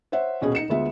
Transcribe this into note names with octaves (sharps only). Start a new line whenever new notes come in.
C5 C#5 E5 F#5
D#1 B2 C#4 G#4
D#4 C#7 E7
D2 G#3 B3 F4 E5